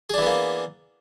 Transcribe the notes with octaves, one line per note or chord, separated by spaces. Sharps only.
E3 A#3 B3 D4 G#4